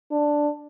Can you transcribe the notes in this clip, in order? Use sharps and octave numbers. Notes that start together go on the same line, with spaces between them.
D4